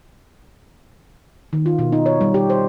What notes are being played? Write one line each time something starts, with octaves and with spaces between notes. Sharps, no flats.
D#3
F4
B2
D#4
C#5
G3
G4
C5